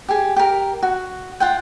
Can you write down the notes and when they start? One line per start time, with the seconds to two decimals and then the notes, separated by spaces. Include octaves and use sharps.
0.08 G4 G#4
0.36 G4 A#4
0.83 F#4
1.40 F4 F#5 G5